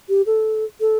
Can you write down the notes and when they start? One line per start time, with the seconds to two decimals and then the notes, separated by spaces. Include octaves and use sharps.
0.09 G4
0.26 A4
0.81 A4